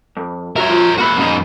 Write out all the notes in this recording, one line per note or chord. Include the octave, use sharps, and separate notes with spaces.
F2
C2 F#4 A#4 C#5 E5
F3 F4
E2 A#3 F#4 E5 B5
F#2 D#4